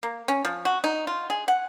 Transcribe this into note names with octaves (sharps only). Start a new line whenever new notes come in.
A#3
C#4
F3
F#4
D#4
F4
G#4
F#5